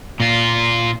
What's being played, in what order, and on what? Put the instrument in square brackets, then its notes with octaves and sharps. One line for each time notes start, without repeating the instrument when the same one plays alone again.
[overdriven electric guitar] A#2 F4